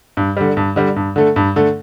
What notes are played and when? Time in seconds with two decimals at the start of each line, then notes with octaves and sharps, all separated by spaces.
0.17 G2
0.37 D3 G3
0.57 G2
0.76 D3 G3
0.96 G2
1.16 D3 A3
1.36 G2
1.56 D3 A3